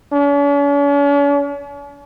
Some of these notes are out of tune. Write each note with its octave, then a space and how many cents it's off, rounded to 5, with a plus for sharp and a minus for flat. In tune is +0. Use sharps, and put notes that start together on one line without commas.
C#4 +45